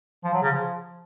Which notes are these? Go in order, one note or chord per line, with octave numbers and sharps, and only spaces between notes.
F3
F#3
C#3
F3